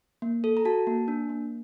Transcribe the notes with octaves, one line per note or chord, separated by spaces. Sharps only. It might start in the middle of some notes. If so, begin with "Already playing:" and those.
A#3
A4
A#5
F#4 A5
A#3
D4
A#3